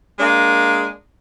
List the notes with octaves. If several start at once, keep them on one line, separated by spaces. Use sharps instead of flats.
G#3 A#3 D4